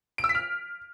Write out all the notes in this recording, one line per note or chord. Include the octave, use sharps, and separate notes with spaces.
D7
E6
B6
F6